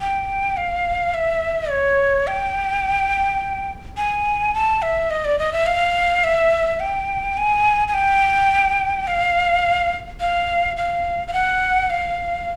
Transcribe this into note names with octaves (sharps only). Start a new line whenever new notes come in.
G5
F5
E5
C#5
G5
G#5
A5
E5
D#5
D5
D#5
E5
F5
E5
G5
G#5
G#5
G5
F5
F5
F5
F5
F#5
F5